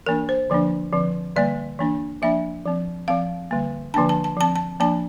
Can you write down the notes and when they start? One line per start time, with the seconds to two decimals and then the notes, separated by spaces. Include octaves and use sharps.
0.06 E3 A#3 D4 A#4
0.29 C5
0.50 D3 F3 A#3 D4
0.93 D3 F3 C4
1.36 D3 G3 A#3 D5
1.79 E3 A#3 D4
2.22 F3 A#3 D4 E5
2.65 F3 C4
3.08 F3 C4 F5
3.51 D3 G3 A#3
3.94 D3 F3 A#3 D4 A5
4.09 A5
4.24 A5
4.37 F3 C4 A5
4.56 A5
4.80 F3 A#3 D4 A5